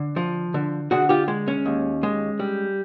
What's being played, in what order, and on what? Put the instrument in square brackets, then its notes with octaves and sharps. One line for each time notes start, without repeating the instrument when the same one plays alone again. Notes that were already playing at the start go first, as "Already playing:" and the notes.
Already playing: [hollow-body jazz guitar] D3
F3
D3
D3 F#4 G#4
F4 G4
G#3
C#4
D#2
G#3
G3